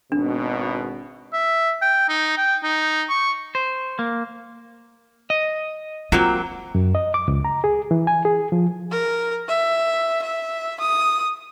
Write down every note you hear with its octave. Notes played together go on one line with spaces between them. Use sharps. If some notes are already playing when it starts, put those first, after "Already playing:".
G#1 B2 D4
E5
G5
D#4
G5
D#4
C#6
C5
A#3
D#5
F#3 A#3 C4 F4
F#2
D#5
D6
C#2
A#5
G#4
E3
G#5
G#4
F3
A#4
E5
E5
D#6